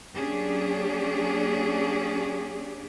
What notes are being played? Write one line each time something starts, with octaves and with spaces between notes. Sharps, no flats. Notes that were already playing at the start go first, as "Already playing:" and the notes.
F#3 A#3 C#4 D4 G4 G#4